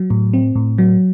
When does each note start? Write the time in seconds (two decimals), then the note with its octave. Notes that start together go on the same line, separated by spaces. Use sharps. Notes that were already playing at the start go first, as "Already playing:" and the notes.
Already playing: F#3
0.10 A2
0.33 C4
0.56 A2
0.78 F#3